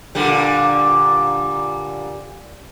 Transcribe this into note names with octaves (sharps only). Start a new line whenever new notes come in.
A#2 D3 G3